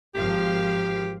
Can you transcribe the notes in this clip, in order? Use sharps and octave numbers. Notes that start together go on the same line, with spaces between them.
G#1 F3 G4 F5